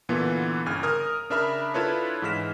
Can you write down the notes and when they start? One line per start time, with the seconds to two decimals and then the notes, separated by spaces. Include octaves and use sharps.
0.09 A#2 D3 E3 B3 F4
0.66 G1 C#3 G#5 F6
0.83 A#4 D#6 F6
1.30 C#3 D4 A#4 E5 B5 F6
1.74 D4 E4 F4 A4 B4 C#5
2.22 G#2 E3 G#3 F6 B6 E7